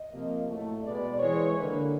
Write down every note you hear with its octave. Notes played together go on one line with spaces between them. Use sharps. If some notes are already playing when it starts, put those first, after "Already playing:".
Already playing: D#5
C3 F3 A#3
A2 F#3 A3
B2 G#3 B3 D5
E3 G#3 C4 C#5
D3 F#3 A#3 B4